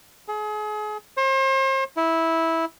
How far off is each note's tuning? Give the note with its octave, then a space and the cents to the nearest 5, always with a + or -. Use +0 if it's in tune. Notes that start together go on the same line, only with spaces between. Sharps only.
G#4 +35
C5 +40
E4 -10